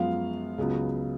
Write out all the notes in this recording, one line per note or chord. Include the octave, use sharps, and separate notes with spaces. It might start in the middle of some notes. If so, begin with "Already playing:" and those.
Already playing: F#2 F3 G#3 B3 F4 F5
C#2 C#3 F#3 B3